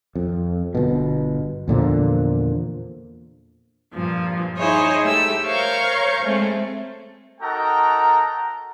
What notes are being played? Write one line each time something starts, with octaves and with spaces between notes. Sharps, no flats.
F2
G1 B2
E2 A#2 D3 F3
G2 A#2 F3
D#4 E4 G#4 C5 C#5 D#5
A3 G4 E6
A#4 C5 C#5 F5 C#6 G6
G#3 A3 C4
D#4 F#4 A4 A#4 G5 A#5